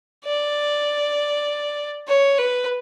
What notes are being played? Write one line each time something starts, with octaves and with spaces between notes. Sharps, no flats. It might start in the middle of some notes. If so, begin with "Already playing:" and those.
D5
C#5
B4